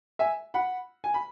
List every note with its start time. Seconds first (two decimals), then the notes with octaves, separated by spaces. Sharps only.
0.19 E5 G#5
0.54 F#5 B5
1.04 G#5
1.14 B5